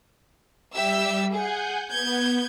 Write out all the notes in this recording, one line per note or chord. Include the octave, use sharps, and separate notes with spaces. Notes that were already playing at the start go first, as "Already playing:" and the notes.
G3 G4 E5 E6
G#4 F#5 G#5 G6
B3 G6 G#6